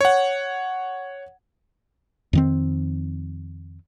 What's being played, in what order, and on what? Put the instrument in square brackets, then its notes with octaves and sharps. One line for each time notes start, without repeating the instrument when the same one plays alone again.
[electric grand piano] C#5 F#5
[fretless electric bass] F2 D#3 C4